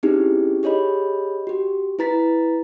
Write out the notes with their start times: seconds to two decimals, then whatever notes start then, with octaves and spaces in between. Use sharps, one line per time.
0.03 C4 C#4 D#4 E4 G4 G#4
0.63 G4 G#4 C#5 D#5 B5
1.47 F#4 G4
1.99 E4 B4 A#5 A6 B6